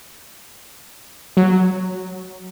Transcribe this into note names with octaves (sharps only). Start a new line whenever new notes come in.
F#3